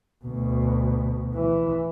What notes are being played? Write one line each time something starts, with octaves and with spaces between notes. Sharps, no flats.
D2 B2
E3